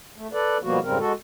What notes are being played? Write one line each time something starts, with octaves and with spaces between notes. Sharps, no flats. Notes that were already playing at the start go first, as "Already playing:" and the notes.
A3
A4 B4 D5
B2 F3 G3 A#3 B3 F#4
F2 G#2 C#3 G3 C4 A#4
G#3 F#4 A4